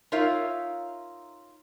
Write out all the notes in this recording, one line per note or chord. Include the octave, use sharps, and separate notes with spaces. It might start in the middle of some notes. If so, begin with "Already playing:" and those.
D#4 F4 A#4 C#5 E5 F5